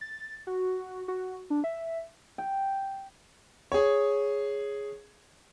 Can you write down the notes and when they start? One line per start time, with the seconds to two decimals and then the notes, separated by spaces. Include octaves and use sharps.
0.01 A6
0.47 F#4
1.08 F#4
1.50 D4
1.64 E5
2.38 G5
3.72 G#4 C#5